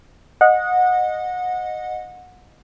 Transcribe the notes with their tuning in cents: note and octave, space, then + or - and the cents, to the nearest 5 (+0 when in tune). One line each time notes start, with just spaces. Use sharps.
D#5 -5 F#5 -25